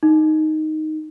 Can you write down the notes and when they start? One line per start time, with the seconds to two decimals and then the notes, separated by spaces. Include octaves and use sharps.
0.03 D#4